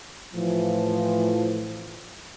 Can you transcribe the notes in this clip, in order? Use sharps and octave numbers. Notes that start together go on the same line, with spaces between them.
A2 E3 F3